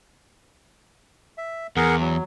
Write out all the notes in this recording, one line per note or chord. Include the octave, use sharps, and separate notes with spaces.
E5
E2 G#4 A#4 F#5
F#3